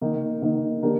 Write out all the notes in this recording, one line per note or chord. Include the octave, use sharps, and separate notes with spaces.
D#3 A#3 D#4
D#3 A#3 D#4
D#3 A#3 D4 G4 A#4